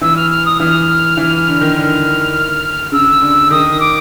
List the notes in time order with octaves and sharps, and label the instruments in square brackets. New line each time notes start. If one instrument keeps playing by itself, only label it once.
[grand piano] E3 [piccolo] E6
[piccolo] F6
F6
D#6
[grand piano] E3 [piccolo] F6
[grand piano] E3
D3
D#3
[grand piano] D3 [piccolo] F6
[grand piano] C#3 [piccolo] E6
[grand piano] D3
[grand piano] D#3 [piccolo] D#6
[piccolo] D6